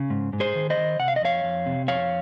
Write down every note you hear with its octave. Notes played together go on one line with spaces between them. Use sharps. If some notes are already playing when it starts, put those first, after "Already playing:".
Already playing: C#3
G#2
G#2
G#4 C5
D#3
C5 D#5
D#3
C3 F#5
F5
D#5
F2 C#5 F5
F2
C3
F2 C#5 F5